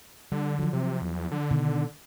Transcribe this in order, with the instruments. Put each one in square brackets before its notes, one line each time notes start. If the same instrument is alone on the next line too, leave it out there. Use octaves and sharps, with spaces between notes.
[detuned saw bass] D3 [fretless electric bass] G3
[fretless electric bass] F3 F#3
[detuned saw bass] C3
E2
D3
[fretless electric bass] B2 D#3